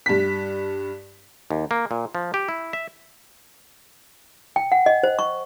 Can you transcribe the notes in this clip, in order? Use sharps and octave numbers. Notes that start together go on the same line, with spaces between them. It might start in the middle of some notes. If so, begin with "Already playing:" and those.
G2 B6
D#2
A#3
A#2
F3
G4
E4
E5
G5
F#5
D#5
C5
C#6